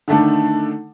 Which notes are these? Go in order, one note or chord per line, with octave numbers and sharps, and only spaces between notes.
D3 D#3 A3 D4 A4